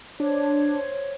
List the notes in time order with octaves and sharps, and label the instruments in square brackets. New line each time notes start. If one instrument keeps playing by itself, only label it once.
[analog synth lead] D4 [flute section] C5 C#5